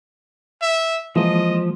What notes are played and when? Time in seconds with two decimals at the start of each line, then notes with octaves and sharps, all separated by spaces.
0.62 E5
1.16 E3 F3 G#3 A#3 D#5